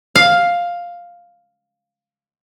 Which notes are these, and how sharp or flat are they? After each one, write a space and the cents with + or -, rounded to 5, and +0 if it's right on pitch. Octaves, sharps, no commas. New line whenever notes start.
F5 +5